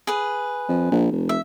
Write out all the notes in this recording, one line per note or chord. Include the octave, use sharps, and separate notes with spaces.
G#4 B4
F2
A#1
F1
E5